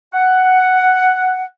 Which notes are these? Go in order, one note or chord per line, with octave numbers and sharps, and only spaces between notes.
F#5